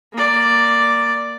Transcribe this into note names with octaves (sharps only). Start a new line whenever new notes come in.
A#3 D5